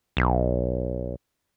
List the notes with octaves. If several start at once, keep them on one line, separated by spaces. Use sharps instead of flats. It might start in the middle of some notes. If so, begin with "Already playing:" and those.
B1